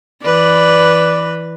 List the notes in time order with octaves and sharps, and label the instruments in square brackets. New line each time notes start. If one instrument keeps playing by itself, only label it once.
[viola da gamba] E3 B4 [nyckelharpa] D5